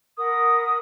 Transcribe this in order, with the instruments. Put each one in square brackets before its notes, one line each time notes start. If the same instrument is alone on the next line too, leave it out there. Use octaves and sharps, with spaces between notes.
[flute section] A#4 F#5 B5 D#6